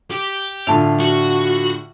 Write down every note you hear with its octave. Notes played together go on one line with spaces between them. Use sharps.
G4
A2 D3 F4 A5 F7
F#4